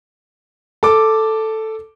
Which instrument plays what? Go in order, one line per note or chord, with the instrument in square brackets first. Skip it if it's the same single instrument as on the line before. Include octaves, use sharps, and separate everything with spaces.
[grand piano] A4 D6